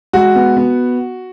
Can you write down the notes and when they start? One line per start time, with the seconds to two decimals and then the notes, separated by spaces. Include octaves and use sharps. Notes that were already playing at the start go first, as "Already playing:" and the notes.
0.13 G#3 F#4
0.35 B3
0.57 B3